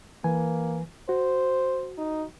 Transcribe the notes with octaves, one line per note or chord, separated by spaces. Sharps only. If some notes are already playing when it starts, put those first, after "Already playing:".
E3 A#3 B4 G#5
F#4 C5
D#4